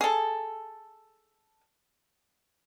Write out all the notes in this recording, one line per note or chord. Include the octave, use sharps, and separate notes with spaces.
G#4 A4